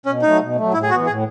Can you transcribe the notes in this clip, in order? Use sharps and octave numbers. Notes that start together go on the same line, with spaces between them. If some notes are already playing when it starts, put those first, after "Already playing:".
B2 C#4
F#3 A3 D#4
B2
F#3 A3
A2 E4
G#4
E3 B3 F#4
A2 G#4